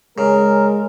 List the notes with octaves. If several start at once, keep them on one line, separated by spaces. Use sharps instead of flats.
C#3 G#3 A#4